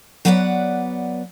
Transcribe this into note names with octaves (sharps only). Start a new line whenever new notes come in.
F#3 B3 B4 D5 F5 F#5